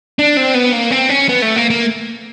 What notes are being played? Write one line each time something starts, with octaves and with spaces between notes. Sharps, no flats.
D4
C4
B3
A#3
C4
C#4
B3
A3
A#3
A#3